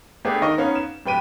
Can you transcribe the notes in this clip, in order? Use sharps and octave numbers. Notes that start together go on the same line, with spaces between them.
A3 B3 D4 G4 G#4
D#3 D#4 A#4 D#5 C#6
B3 C#4 D#4 F5
E7
D1 G4 B4 G5 D7 D#7